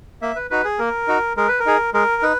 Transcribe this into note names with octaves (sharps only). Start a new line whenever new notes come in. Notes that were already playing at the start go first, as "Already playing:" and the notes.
A#3 E5
B4
D#4 F#4 B4
G#4
A#3 A#4
D#4 F#4
G#3 A#4
B4
A#4
D#4 G#4
G#3 A#4
D#4 B4